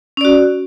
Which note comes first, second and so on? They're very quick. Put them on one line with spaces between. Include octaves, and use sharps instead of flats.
C#4 D5 F#4